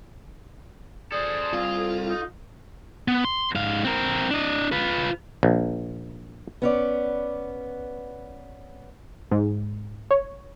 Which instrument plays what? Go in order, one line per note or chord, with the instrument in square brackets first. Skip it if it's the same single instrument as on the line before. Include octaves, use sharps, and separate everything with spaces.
[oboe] G#4 [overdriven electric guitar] A4 C5 [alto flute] D5
[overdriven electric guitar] C2 [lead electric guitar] F4
[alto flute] A4
[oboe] D#4
[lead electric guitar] B3
C6
G#2 F5
C4 A#4
D4 D#5
F4 B4
[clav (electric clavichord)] A#1
[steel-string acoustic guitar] B3 C#4 D5
[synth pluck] G#2
C#5